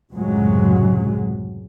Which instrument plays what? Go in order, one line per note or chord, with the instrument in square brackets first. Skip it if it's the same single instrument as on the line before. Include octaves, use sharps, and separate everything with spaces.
[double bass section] C#2 F#2 A2 C3 F#3 G#3